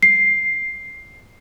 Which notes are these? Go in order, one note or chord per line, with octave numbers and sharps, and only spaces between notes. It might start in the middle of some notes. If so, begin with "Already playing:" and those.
C7